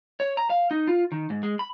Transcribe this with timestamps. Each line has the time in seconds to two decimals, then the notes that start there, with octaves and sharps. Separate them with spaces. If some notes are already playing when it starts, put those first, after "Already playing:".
0.20 C#5
0.37 A#5
0.50 F5
0.71 D#4
0.88 F4
1.12 D#3
1.30 G#2
1.43 G#3
1.59 B5